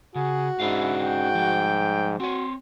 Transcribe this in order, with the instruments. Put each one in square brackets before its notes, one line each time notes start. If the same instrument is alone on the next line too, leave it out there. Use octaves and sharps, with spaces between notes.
[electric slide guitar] C#3 [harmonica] F#4 [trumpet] G#4
[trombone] G#2 [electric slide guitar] C#4 D4 F5 [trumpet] E4
[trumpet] G5
[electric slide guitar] F3 G3
[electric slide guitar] C4 C#5 [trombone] F#4 [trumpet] C6